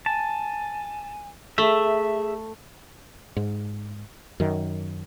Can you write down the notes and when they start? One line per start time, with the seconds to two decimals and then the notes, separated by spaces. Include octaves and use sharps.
0.06 G#5 A5
1.58 A3 G#4 E5
3.36 G#2
4.40 F#2 D#3